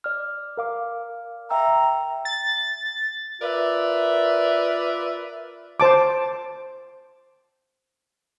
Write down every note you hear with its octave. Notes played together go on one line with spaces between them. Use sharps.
D5 F6
A#4 F5 D6
E5 G5 A#5 E6
A6
F4 A#4 B4 D5 E5
C5 A5 D6